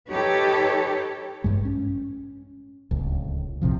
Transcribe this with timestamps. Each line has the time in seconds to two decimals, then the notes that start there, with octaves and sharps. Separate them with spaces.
0.11 D#4 G4 A4 B4 C#5
1.44 A1 G2 G#3
1.65 C#4
2.91 D1 C#2
3.62 A#1 A2 C3 F3